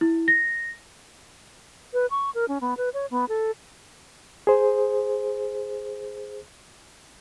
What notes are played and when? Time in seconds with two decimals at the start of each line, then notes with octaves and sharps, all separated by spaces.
0.01 E4
0.28 A#6
1.93 B4
2.11 C#6
2.35 A#4
2.48 C#4
2.61 B3
2.77 B4
2.94 C#5
3.11 B3
3.29 A4
4.47 G#4 C5